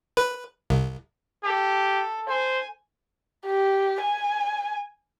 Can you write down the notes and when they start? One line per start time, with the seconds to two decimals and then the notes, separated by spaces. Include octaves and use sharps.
0.17 B4
0.70 C2
1.45 G4 A4
2.29 C5 G#5
3.46 G4
4.02 G#5